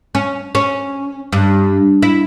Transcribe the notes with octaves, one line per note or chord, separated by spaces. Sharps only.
C#4
C#4
G2
E4